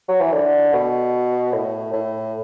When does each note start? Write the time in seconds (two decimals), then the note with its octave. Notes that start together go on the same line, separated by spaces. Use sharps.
0.08 F#3
0.20 E3
0.33 D3
0.73 B2
1.53 A2
1.93 A2